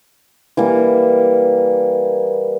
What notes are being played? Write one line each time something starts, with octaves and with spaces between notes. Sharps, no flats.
E3 G3 A#3